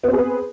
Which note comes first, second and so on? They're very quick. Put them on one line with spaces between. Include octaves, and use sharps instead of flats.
B3 C4 G#4 B4